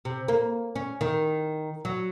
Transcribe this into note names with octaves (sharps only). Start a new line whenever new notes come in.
C3
A#3
C#4
D#3
F#3